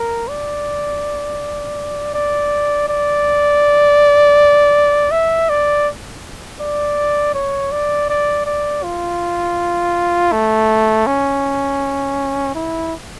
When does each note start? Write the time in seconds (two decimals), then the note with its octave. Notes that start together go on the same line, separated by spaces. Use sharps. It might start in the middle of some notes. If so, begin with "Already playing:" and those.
Already playing: A#4
0.28 D5
2.14 D5
2.88 D5
5.12 E5
5.49 D5
6.60 D5
7.34 C#5
7.72 D5
8.09 D5
8.46 D5
8.83 F4
10.32 A3
11.06 C#4
12.55 E4